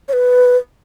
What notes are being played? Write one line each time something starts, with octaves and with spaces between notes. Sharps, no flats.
C#5
B4